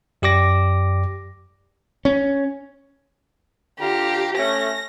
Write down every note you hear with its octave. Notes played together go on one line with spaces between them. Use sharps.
F#2 G4 D5 D6 A#6
C#4
D3 F4 G4 A#5
A3 C#4 A#6